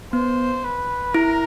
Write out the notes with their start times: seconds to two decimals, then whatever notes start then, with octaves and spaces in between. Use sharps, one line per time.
0.13 B3 C5
0.64 B4
1.14 E4 A#4